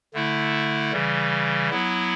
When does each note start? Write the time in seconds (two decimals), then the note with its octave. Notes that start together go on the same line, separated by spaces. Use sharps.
0.14 D3 A3 E4
0.92 C#3 E3 G3
1.70 F#3 B3 E4